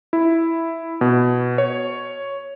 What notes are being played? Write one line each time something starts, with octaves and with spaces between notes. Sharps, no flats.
E4
B2
C#5